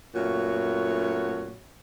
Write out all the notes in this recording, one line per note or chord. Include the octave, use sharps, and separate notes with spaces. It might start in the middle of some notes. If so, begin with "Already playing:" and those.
F#2 A#2 A3 B3 F#4 C#5